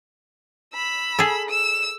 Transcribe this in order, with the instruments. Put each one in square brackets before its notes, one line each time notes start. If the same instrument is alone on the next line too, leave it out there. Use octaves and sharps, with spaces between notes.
[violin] B5 E6
[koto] G#4 A4
[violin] E6 E7